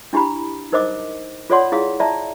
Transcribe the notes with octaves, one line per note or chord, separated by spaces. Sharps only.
D4 E4 G4 A#5 B5
D#4 A#4 C5 D#5 D6 D#6
F4 A4 C#5 D5 F#5 C6
E4 G#4 F5 D#6
D5 E5 A5 A#5